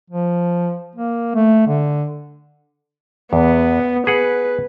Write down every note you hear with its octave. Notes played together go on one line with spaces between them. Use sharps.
F3
A#3
A3
D3
E2 B3
G#4 B4 F#5